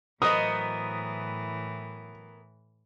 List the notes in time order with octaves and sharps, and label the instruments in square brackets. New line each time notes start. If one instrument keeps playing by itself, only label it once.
[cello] A2 E3 [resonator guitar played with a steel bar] F#3 C5 D#5 [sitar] B3 A#4 [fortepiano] D#6